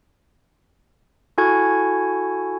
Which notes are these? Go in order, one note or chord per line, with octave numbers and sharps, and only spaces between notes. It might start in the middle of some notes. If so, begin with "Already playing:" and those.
E4 F#4 A4 G#5 C#6 G#6